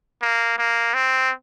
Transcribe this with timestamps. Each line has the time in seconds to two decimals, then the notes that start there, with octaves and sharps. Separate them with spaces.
0.22 A#3
0.58 A#3
0.94 C4